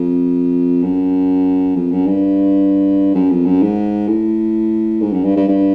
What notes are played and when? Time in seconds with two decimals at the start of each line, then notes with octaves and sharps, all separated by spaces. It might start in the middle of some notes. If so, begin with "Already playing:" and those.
Already playing: F2
0.83 F#2
1.76 F2
1.92 F#2
2.07 G2
3.15 F#2
3.31 F2
3.46 F#2
3.62 G#2
4.08 A2
5.01 G#2
5.13 F#2
5.24 G2
5.36 G2
5.48 G2